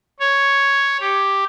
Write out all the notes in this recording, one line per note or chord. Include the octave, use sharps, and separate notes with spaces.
C#5
G4